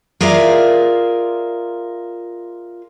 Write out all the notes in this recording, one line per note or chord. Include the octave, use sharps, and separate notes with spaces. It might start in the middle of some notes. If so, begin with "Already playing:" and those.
F4 G#4 A#4 D5 E5 F5